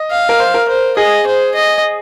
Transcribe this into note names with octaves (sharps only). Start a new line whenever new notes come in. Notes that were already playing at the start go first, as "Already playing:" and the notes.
Already playing: D#5
F5
A#4
C5
A#4
C5
G#4 D#5
C5
D#5